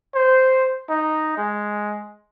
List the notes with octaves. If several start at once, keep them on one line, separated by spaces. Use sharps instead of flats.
C5
D#4
G#3